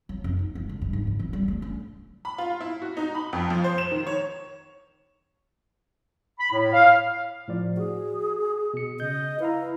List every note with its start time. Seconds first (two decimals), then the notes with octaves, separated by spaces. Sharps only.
0.09 F#3
0.24 F#2
0.39 D#4
0.55 G#3
0.69 D3
0.82 G2
0.93 G#2
1.07 D3
1.19 E3
1.33 G3
1.48 A3
1.62 C#4
2.25 B5
2.38 F4
2.60 E4
2.82 F#4
2.97 D#4
3.15 B5
3.33 F2
3.50 F3
3.64 C5
3.78 E7
3.91 D#3
4.07 C#5
6.39 B5
6.52 A2
6.73 F5
7.48 A2 F3 D5
7.77 F#4 G#4
8.74 B2 C#7
9.00 C#3 D#5 G6
9.40 E4 B4 F5 A#5